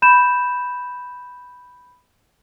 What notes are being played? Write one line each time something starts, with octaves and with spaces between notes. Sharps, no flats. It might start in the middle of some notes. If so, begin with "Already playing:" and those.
B5 G6 E7